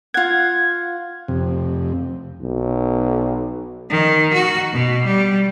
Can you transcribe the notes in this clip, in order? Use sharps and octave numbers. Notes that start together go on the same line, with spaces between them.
F4 F#5 G#6
F2 C3
B1
D#3
F#4
B2
G3